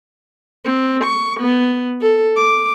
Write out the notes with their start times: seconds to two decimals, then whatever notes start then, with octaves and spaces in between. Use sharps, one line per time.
0.65 C4
1.04 C#6
1.40 B3
2.01 A4
2.36 D6